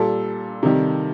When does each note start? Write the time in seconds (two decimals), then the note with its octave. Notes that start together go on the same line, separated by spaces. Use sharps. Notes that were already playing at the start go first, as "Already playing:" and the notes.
Already playing: A#2 G3 A4
0.63 C3 D#3 G3